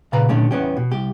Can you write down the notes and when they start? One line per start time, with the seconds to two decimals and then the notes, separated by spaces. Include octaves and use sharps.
0.13 A#2 C#3 B4 F5 A#5
0.29 A#2 D3 D#3 A3 C#4 G4
0.51 E2 B3 C#4 G4
0.77 B2
0.91 C2 G4